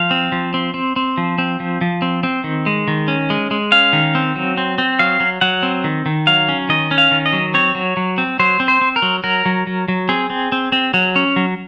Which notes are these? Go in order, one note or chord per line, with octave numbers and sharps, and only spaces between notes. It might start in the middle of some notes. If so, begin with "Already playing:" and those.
Already playing: F3 F5
C4
F3
C4
C4
C4
F3
C4
F3
F3
C4
C4
D#3
G#3
D#3
C#4
G#3
G#3
C#4 F5
D#3
C4
F#3
C4
C4
F#3 F5
F#3
F#3 F#5
C4
D#3
D#3
F#3 F5
C#4
D#3 D#5
C#4
F5
D#3
D#5
F#3
C4 C#5
F#3
F#3
C4
F#3 C5
C4
C5
C4
A#4
F#3
F#3 A#4
F#3
F#3
F#3
C4 G#4
C4
C4
C4
F#3
C#4
F#3